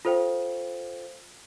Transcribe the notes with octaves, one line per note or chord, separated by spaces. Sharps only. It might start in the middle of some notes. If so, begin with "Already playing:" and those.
F4 A4 C5 F5 G5